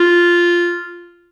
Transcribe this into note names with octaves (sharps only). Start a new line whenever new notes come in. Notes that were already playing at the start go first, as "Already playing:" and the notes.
Already playing: F4